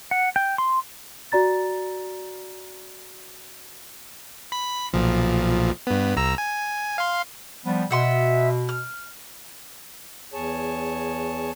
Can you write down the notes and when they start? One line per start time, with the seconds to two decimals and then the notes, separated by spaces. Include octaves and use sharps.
0.11 F#5
0.36 G5
0.58 C6
1.32 F#4 D5 A#5 A6
4.52 B5 B6
4.93 B1 A#2 F3
5.87 G2 B3
6.17 C2 A#5 E6
6.38 G#5
6.98 F5 C6
7.66 F3 G3 B3
7.91 B2 E5 F#5 C6
8.69 F6
10.33 E2 G#4 C#5 A5